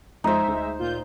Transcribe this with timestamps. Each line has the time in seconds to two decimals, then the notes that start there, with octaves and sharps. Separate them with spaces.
0.24 F2 G#3 D#4 C5 E5
0.48 D2
0.78 A#2 F4 G6